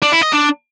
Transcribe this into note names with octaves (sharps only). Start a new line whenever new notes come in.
D4
E4
D#5
D4